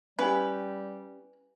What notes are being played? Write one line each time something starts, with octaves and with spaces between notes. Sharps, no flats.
G3 C#4 E4 G4 B4 F5 G#5